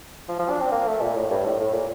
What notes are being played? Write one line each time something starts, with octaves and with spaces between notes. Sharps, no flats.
F3
F3
D4
C4
A#3
A3
A#2
A2
G2
A2
A2
A#2